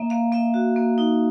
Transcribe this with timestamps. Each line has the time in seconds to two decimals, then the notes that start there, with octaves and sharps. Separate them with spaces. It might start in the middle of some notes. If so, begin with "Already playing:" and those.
Already playing: A#3 E5
0.10 A#3 F5
0.32 A#3 E5
0.54 F#4
0.76 A#3
0.98 D#4